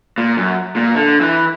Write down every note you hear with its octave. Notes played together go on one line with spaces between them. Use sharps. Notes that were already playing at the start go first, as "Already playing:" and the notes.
A#2
F#2
A#2
D3
E3